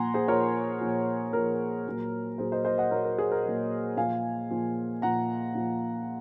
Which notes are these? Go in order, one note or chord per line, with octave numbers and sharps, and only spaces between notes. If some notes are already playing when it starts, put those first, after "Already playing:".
Already playing: A#2 F3 F#5 G#5 A#5 C6
G#4 C5
A#2 F3 A#4 C#5
A#2 F3
A#2 F3 A#4
A#2 F#3
A#2 F#3 G#4 C5
C5 D#5
C5 D#5
D#5 F#5
A#2 F#3 A#4 C#5
A#4
G#4
A#4
A#2 F#3
A#2 F3 F5 G#5
A#2 F3
A#2 F3 F#5 A#5
A#2 F3